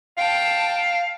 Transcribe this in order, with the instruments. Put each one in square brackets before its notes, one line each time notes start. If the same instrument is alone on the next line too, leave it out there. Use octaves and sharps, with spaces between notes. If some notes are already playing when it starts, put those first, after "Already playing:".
[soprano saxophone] F5 [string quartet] G5 A5